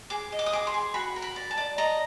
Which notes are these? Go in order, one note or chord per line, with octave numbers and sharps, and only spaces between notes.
G#4 D6
D#5
D6
D#6
G#4 D6
C6
G#4
F#4 B5
A#4
B5
D5
A5
D5
D#5 A#5